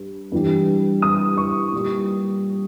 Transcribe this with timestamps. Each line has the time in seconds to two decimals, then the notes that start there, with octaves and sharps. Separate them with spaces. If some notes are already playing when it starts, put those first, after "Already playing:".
Already playing: G2 G3
0.32 G2 E3 G3
1.02 D#6
1.37 C#6
1.72 A#2 G3